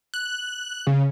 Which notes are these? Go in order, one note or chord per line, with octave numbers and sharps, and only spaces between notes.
F#6
C#3